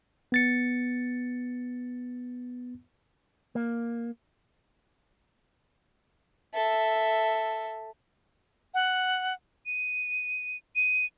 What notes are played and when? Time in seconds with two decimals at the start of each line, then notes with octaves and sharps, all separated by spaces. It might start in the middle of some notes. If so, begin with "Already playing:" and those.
0.32 B3 A6 C#7
3.55 A#3
6.54 A4 E5
8.74 F#5
9.66 D#7
10.76 D#7